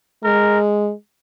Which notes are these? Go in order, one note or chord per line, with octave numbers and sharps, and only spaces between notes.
G#3 A#4